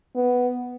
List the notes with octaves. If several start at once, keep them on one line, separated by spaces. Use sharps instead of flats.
B3